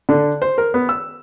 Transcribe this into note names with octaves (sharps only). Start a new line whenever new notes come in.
D3
C5
A#4
B3
E6